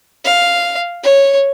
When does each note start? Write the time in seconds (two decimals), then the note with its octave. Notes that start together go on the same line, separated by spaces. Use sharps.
0.25 F5
1.03 C#5